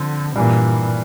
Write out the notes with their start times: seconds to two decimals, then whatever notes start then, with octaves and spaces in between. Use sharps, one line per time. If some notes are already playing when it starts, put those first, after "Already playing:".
Already playing: D3 F3 C4
0.36 G2 A#2 E3 A#3